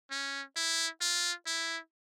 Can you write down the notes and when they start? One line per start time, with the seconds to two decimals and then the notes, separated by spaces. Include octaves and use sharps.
0.11 C#4
0.56 E4
1.01 F4
1.47 E4